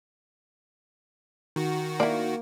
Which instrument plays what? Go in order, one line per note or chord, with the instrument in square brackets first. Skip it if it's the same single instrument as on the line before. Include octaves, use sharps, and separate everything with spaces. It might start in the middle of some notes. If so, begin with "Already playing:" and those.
[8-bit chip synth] D#3 F#4
[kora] A#3 [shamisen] E4 D5